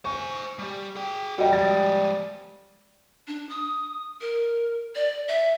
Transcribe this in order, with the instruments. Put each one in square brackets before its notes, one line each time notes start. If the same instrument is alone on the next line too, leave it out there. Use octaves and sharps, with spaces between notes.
[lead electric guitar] C5 G#5 [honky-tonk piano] C#6
[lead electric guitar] G3 G4
G#4 G5
[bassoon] G3 [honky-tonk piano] F#4 D#5 G5 [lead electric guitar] A4 C#5
[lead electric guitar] F3 G#3 [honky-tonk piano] A6
[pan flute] D4
D#6
A#4
D5
E5